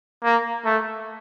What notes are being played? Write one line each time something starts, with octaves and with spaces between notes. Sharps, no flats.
A#3
A3